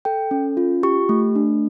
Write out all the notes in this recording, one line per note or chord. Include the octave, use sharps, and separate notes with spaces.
A4 G5
C#4
F4
G4 C#6
A3
D4